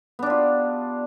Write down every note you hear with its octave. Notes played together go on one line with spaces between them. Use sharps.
B3 D4 F4 G4